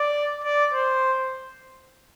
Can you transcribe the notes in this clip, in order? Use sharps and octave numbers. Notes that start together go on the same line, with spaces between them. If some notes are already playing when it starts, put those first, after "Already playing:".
Already playing: D5
D5
C5